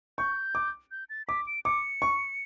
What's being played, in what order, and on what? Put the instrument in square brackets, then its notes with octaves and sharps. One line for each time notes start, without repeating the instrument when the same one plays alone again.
[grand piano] C#6 [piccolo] G6
[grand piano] D6
[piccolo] G6
A6
[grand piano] D6 [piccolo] B6
[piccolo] D7
[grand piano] D6 [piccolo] C#7
[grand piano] C#6